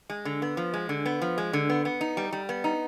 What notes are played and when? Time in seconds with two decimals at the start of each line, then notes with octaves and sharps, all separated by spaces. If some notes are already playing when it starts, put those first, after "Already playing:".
0.10 G#3
0.25 D3
0.42 B3
0.57 F3
0.74 G#3
0.89 D3
1.06 B3
1.22 F3
1.38 G#3
1.53 D3
1.69 B3
1.85 B3
2.01 D#4
2.17 G3
2.32 G3
2.49 B3
2.64 D#4